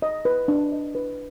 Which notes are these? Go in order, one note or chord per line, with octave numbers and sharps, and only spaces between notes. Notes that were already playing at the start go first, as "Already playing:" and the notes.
D#5
B4
D4
D#5
B4